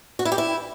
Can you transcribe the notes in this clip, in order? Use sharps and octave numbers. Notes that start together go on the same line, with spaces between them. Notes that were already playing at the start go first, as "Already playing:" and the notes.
F#4
E4
G4
E4